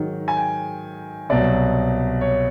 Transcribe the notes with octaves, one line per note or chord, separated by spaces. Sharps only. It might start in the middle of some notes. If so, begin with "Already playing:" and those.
Already playing: G#2 D#3 F#3
G#5
G5
C2 B2 F#3 D5
C#5